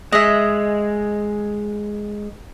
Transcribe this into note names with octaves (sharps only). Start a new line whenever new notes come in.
G#3 D#5 E5